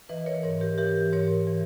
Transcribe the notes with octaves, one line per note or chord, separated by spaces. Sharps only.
E3 B4 D#5
A#4 C#5
G#2 A#4 C#5
G4 A#4
E3 G4 A#4
G#2 A#4 C#5
E3